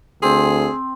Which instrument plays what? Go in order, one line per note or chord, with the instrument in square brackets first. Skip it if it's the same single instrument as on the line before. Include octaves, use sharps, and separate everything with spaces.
[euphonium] D2 [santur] C4 [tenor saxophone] G#4